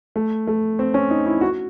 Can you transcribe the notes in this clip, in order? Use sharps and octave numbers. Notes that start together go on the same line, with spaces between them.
A3
A3
C4
C#4
D#4
E4
F#4